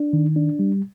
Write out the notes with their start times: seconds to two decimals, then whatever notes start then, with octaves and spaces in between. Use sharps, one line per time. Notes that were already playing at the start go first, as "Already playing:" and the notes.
Already playing: D4
0.13 D#3
0.36 D4
0.59 G3